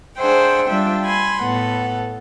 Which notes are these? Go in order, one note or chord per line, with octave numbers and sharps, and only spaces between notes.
D4 G#4 C5 E5 F#5 G5
G3 D4 F4 E5 G5
G#5 B5 C6
A2 B3 A4 F#5